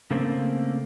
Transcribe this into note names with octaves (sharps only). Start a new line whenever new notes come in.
C#3 A3 A#3 C4